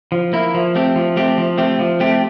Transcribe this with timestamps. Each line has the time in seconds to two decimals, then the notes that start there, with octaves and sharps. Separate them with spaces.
0.12 F3
0.33 A#3 E4
0.54 F3
0.75 A3 C4 G4
0.96 F3
1.17 A3 C4 G4
1.38 F3
1.58 A3 C4 G4
1.79 F3
2.00 A3 C4 G4